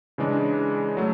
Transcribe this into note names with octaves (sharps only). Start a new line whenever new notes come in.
C#3 E3 G#3 D4
F#3 A3